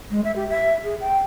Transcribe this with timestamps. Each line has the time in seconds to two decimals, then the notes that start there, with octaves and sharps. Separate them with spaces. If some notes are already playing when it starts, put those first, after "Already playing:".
0.11 G#3
0.25 E5
0.36 G4
0.49 E5
0.84 G#4
1.01 G5